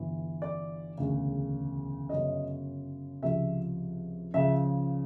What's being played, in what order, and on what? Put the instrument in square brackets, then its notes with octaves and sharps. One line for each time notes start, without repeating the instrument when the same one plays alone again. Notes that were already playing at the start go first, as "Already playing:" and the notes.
Already playing: [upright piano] G1 G2 E3
D5
E1 D2 C#3
G1 F#2 C#3 D#5
C#2 C3 F3 E5
C#2 C#3 F3 E5